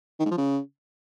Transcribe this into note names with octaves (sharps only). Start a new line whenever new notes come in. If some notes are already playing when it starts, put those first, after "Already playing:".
D#3
G#2
F3
C#3